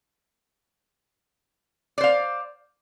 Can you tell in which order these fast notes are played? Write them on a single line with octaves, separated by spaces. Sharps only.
D5 C5 F5